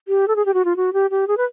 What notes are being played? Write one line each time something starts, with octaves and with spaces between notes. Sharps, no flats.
G4
A4
G#4
G4
F#4
F4
F#4
G4
G4
G#4
B4